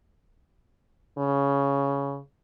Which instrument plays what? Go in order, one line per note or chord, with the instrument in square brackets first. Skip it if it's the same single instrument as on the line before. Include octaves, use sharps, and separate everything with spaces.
[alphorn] C#3